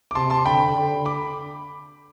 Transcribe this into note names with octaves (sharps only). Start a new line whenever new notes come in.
D6
C3 A5 C6
A5 C6
D3 G5 B5
D3
B5 D6